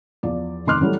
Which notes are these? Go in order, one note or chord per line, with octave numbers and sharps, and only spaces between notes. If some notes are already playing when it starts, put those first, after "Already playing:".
E2 F3 D5
F1 D#3 C6 D6 F6 F#6
E3 F#3 G3 A3